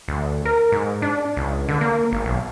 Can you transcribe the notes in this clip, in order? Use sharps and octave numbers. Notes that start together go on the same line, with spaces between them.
D2
A#4
G#2
D4
C#2
D3
A#3
G#1
B1